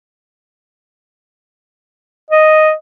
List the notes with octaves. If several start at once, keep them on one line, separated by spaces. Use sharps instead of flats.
D#5